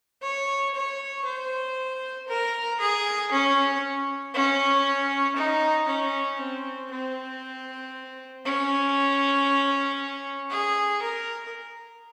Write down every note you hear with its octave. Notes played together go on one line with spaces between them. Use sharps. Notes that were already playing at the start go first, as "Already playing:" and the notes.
C#5
C#5
C5
A#4
G#4
C#4
C#4
D#4
C#4
C4
C4
C#4
G#4
A#4